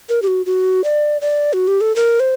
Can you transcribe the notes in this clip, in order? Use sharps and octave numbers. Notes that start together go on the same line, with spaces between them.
A#4
G4
F#4
F#4
D5
D5
F#4
G4
A4
A#4
C5